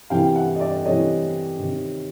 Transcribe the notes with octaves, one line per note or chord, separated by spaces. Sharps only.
C3 E3 F5 G5
E5 F#5
D#5
D5 E5
D5
C3 E3 C#5 D#5
C3 D#3